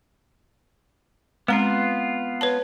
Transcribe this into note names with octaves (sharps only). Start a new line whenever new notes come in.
G#3 B3 C4 F4 A#5
B4 C#5 A5